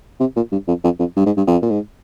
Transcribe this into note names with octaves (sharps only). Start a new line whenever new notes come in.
C3
A#2
G2
F2
F2
F2
G2
G#2
G2
F2
A#2
G#2